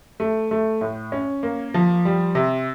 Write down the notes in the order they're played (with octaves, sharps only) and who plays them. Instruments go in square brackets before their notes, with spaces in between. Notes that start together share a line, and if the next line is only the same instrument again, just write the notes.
[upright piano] A3
A3
A2
C#4
A#3
F3
G3
C3